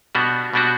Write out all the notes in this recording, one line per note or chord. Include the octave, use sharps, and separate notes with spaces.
B2 G3 B3 D4 F#4
B2 G3 B3 D4 F#4